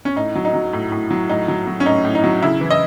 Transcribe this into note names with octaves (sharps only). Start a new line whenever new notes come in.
C#4
A2 D#4
F#3
D#4
F#3
A2
A2
F#3
A2 D#4
F#3
F#3
C#4
A2 D#4
A2
D#4
F#3
C#3 E4
E3
D#5